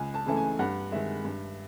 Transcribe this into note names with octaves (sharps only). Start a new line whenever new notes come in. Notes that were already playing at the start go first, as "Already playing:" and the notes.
Already playing: C#2 G#5
A5
C#3 E3 A3 A5
G#5
G2 F#5
D#3 G#3 E5
G2